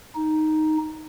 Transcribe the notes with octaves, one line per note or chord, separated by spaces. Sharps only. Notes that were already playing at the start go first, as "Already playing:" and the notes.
D#4